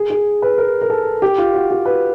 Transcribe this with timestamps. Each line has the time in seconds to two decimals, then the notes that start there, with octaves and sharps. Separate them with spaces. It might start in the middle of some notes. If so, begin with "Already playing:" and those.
Already playing: G#4
0.10 G#4
0.42 B4
0.58 A#4
0.82 A#4
0.90 A4
1.22 G4
1.38 F4
1.54 F#4
1.71 G4
1.85 B4